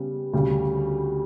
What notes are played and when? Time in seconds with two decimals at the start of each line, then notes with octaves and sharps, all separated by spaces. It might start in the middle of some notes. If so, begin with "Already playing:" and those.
Already playing: C#3 G3 B3
0.33 D2 C#3 G3